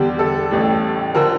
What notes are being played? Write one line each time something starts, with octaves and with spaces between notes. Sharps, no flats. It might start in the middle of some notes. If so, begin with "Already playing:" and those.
Already playing: E2 D3 G3 G4
A4
A1 A2 G3
D3 F3 A#4